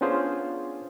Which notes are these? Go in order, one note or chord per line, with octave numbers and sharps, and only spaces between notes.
B3 C#4 D4 F4 G#4 C5